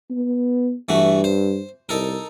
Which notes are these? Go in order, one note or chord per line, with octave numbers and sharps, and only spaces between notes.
B3
G2 E3 A3 F#4
C5
C2 D#4 A4 A#4